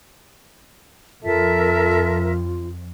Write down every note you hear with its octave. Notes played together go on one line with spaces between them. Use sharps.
F2 F4 A4 A#4 E5